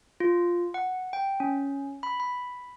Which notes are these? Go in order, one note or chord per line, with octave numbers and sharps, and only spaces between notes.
F4
F#5
G5
C#4
B5
B5